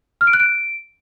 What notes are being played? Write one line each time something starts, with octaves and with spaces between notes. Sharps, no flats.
F6
D7
F#6
D7